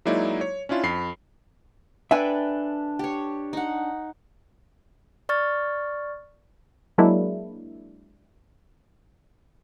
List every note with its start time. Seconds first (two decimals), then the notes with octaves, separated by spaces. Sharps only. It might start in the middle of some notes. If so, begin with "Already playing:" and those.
0.05 F#3 G#3 A#3 D#4 E4 D5
0.41 C#5
0.69 C#4 D4 E4 F4
0.83 F2 B5 C7
2.11 D4 A4 B4 E5 G5 G#5
2.99 G4 C#5
3.53 D#4 F#5
5.29 D5 C#6 F6 A6
6.98 F#3 G#3 A#3 D4 E4